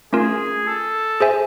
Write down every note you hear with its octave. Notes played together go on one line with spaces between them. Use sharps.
A3 C#4 F4 G#4 A#4
A4
G#4 C5 E5 G#5